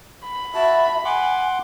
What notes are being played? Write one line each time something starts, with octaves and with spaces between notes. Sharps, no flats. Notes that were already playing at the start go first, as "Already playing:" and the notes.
B5
F#4 E5 A5
F#5 G#5 C6 D6